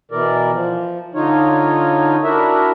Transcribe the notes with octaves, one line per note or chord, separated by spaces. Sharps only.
B2 E3 A#4 D5
F3
D3 D#4 F4 C#5
D4 E4 F#4 A#4 E5